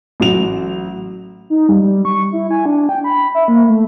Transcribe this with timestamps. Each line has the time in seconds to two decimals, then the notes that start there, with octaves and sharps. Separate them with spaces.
0.20 A1 F#3 F7
1.50 D#4
1.69 G3
1.82 G3
2.05 C#6
2.32 E4
2.51 G#5
2.66 D4
2.89 G5
3.04 B5
3.35 E5
3.48 A#3
3.69 A3